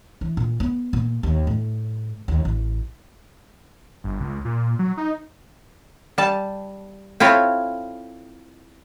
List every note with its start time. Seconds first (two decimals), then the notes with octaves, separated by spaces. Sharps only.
0.21 E3
0.37 A#2
0.60 B3
0.93 A#2
1.23 D#2
1.47 A2
2.28 D#2
2.45 A1
4.04 G1
4.20 C#2
4.45 A#2
4.79 F#3
4.97 D#4
6.18 G3 A5
7.20 C4 E4 F4 A4 C#5